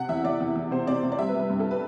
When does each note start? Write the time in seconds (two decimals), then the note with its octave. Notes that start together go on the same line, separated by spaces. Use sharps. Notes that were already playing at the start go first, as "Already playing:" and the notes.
Already playing: C3 F#5
0.09 E2 E5
0.24 E2 D5
0.40 E2
0.56 E2
0.71 C3 C5
0.87 C3 D5
1.03 C3
1.12 D5
1.19 G3 E5
1.29 B4
1.34 G3
1.40 B4
1.50 G2
1.60 A4
1.71 B4